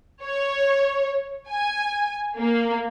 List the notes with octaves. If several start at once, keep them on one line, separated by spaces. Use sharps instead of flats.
C#5
G#5
A#3